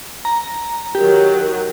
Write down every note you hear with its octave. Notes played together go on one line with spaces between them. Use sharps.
A#5
D#3 F#3 G4